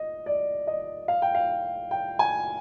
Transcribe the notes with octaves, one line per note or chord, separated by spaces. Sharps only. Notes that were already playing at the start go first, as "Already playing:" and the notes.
Already playing: D#5
D5
D#5
F5
G5
F5
G5
G#5